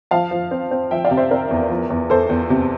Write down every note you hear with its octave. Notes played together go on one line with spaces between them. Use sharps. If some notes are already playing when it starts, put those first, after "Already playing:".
F3 F5 A5
F3
C4
C4
F3 E5 G5
D5 F5
C3
C5 E5
C4 A#4 D5
E2
F3
E2
E2 A4 C5
E2
C3